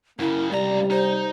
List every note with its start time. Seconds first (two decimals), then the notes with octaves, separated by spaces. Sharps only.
0.19 F#2 C#3 A#3 E4
0.51 C#2 C3 G3 D5 A#5
0.90 D#4 C5